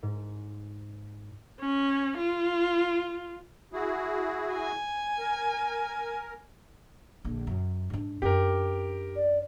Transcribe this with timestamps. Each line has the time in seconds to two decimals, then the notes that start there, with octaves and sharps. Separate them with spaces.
0.03 G#2
1.60 C#4
2.18 F4
3.73 E4 F#4 G#4
4.53 G#5
5.18 A#4
7.24 A#1 D3
7.47 F#2
7.90 G#2 D4
8.22 F#2 D4 G4 A#4
9.16 D5